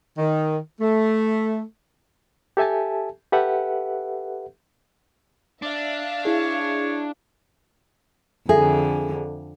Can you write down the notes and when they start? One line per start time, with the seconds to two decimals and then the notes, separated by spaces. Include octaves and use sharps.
0.18 D#3
0.81 A3
2.57 G4 A4 E5 G#5 A5
3.32 G4 A4 B4 E5 F#5
5.62 D4 E5 F5
6.25 E4 G#4 C#5
8.49 F2 D3 G#4 A4 E5